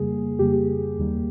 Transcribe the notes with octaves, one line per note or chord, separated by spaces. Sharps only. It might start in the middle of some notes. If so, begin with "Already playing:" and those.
Already playing: F2 C#3 G3 A#3 G#4
F2 C#3 G3 A#3 G4
D#2 D#3 G3 A#3